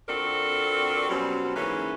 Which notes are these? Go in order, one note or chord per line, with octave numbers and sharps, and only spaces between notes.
F2 C4 D4 F#4 A4 A#4
B2 F#3 G3 C4 C#4
G#2 E3 A#3 C#4 A4 B4